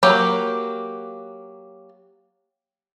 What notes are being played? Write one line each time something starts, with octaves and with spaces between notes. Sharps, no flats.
F#3 A#3 G4